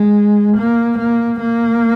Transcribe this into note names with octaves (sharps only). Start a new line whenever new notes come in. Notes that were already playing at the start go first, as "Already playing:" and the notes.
Already playing: G#3
A#3
A#3
A#3